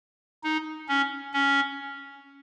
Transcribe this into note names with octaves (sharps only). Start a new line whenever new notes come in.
D#4
C#4
C#4